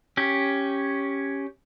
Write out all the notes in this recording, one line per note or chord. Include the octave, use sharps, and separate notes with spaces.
C#4 G4